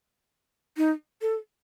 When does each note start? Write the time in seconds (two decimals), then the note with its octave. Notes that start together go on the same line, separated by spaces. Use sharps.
0.77 D#4
1.22 A4